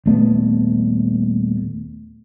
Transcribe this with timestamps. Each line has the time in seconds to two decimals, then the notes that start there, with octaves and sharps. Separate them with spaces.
0.06 D#1 A3 B3